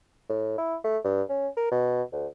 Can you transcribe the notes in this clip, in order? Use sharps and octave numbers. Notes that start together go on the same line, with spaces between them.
A2
E4
A3
G2
C#4
A#4
B2
D2